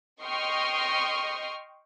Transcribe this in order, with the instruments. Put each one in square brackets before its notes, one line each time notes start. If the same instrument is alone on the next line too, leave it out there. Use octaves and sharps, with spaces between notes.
[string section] D#5 G5 C6 C#6 D#6 F6